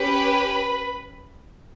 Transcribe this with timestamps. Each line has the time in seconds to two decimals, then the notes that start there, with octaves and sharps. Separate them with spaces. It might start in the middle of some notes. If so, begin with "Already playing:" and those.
Already playing: C#4 G4 B4 B5